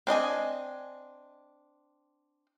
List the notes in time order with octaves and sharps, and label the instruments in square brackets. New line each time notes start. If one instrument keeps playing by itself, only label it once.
[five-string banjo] C4 D4 D#5 G#5